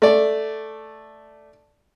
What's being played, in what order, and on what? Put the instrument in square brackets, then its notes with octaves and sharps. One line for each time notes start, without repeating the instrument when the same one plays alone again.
[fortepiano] A3 D5